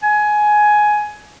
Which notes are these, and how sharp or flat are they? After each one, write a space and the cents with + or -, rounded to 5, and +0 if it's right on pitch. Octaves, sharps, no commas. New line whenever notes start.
G#5 +15